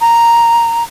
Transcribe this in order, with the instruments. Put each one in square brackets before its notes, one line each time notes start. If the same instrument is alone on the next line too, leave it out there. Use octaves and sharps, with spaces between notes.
[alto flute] A#5